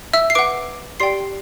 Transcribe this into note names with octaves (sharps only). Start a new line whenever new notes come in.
E5 E6
C7
B4 F#5 D6 D7
G4 D5 G5 C6 C7